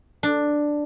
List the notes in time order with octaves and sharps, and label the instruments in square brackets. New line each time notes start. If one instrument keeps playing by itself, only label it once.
[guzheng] D4